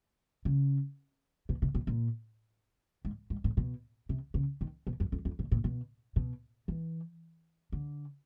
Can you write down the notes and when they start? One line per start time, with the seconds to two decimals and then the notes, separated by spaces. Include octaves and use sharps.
0.45 C#3
1.49 B2
1.62 C3
1.75 B2
1.87 A#2
3.05 G#2
3.30 G#2
3.44 A2
3.57 B2
4.09 C3
4.34 C#3
4.61 D#3
4.87 B2
5.00 F#2
5.12 F2
5.25 F2
5.39 A#2
5.52 A#2
5.64 B2
6.16 B2
6.68 E3
7.72 D3